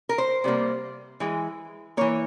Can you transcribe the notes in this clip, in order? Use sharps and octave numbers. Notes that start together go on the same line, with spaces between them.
A#4
C5
C3 G3 A#3
E3 G#3
E3 A#3 C#5